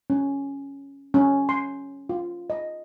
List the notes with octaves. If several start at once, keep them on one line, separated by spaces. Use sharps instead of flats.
C#4
C#4
C6
F4
D#5